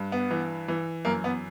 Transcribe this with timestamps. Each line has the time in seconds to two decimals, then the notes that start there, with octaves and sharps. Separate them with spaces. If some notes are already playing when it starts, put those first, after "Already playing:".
Already playing: G2
0.12 B3
0.31 E3
0.68 E3
1.05 F#2 A#3
1.24 B3